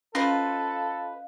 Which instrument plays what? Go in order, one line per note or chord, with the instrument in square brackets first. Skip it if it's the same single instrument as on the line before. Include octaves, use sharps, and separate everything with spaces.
[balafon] C#4 [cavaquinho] F4 B4 C5 [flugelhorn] A4 [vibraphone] D#5 F5